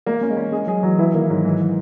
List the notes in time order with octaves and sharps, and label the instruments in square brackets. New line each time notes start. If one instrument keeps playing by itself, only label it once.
[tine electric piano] G#3 [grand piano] A#3
[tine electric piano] A#3 [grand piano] C#4
[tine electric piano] G#3
[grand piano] C#4
[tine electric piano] G#3 [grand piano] G#4
[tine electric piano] F#3 [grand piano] G#4
[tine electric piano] E3 [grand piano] F#3
[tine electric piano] E3 [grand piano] E4
[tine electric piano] D#3 [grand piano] A#3
[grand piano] G#2 [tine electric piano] F#3
[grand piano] E3 [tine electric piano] G#3